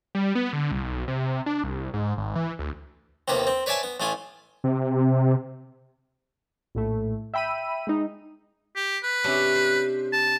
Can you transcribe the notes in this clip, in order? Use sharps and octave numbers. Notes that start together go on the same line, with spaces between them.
G3
B3
D3
C2
B1
C3
D4
C2
G#2
G#1
E3
D2
D#2 C3 A#3 B3 B4
C4
B4 C#5 D5 E5 G#5 A5
B3
A1 A3 F4 G#5
C3
A#1 A2 A3
E5 G5 B5 E6 D#7
G#3 D#4
G4
B4
C3 C#4 D4
C5
A5